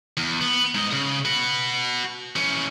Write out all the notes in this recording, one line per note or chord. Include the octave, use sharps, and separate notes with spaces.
E2
B3
G#2 D#5
C#3
F#4 B4
E3 C#4